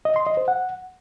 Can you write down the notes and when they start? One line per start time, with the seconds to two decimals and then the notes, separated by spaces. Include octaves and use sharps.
0.05 D#5
0.16 C6
0.27 D#5
0.37 C5
0.48 F#5